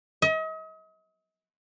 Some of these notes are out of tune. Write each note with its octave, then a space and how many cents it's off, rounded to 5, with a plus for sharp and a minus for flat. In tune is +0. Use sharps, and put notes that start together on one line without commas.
D#5 +40